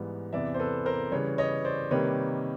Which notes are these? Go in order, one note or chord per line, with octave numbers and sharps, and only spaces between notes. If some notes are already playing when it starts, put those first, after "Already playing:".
Already playing: G#2 E3 G3 B3
E2 C3 E3 D5 E5
C5
A4 B4
A#4 C5
C#3 E3 G3 B4 C#5
C#5 D#5
C5 D5
C3 D#3 G3 A#3 B4 C#5